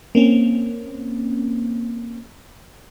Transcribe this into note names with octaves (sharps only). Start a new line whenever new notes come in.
A#3 C4 C#4